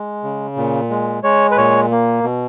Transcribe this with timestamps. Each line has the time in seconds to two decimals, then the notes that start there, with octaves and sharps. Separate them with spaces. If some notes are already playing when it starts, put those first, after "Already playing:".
Already playing: G#3
0.24 C#3
0.57 A#2
0.90 G#3
1.23 G#3 C#5
1.51 B4
1.57 A#2 C#5
1.91 A#3
2.24 B2